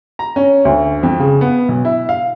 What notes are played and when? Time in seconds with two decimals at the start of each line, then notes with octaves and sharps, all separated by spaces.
0.19 A#5
0.36 C#4
0.65 D2
1.03 F2
1.19 C#3
1.41 B3
1.69 B1
1.85 E4
2.09 F5